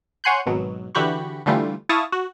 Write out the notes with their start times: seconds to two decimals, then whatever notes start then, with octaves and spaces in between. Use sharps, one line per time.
0.24 C#5 F#5 G#5 C6 F#6 G6
0.46 G#1 B2 F#3
0.95 D3 E3 F#4 G4 B5 C#6
1.46 D3 E3 G3 A3 F4
1.89 E4 F5 A5 C#6 D#6
2.12 F#4